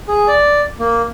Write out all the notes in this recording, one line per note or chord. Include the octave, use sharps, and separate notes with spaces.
G#4
D5
A#3